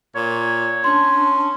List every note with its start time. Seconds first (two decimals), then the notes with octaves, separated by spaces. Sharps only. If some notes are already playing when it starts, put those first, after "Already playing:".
0.16 A#2 C#5
0.84 C#4 D4 C6